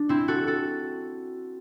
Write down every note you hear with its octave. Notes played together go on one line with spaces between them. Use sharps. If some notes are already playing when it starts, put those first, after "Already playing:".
Already playing: D4
C4 E4
F#4 A4
F#4 A4